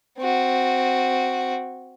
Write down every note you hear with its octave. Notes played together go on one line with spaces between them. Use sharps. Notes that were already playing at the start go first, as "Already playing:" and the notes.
C4 F#4